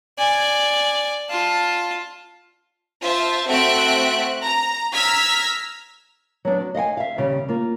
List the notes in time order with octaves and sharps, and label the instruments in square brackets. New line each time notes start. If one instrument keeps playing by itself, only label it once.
[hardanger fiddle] D5 G#5
F4 A5
[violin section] F4 C5 E5 A5
A3 C4 F#4 E5 F#6 D7
A#5
A#5 E6 F6 G#6 B6
[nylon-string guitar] F#3 B3 D4
F#4
D#5 F5 F#5 G#5
E5 F5
D#2 C#3 G3
A#3 F4